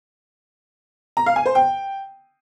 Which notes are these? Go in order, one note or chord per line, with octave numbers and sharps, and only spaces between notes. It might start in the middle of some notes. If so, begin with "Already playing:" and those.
A#5
F5
G#5
C5
G5